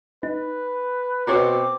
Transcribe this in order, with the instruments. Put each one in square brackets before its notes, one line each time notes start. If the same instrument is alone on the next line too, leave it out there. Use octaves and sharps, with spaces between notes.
[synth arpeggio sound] D#4 [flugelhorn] B4
[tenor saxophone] B2 [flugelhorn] C4 [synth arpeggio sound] F#4 C#5 A#5 [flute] D6